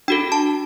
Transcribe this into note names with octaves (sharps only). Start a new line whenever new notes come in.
D4 F#4 A4 G5
A5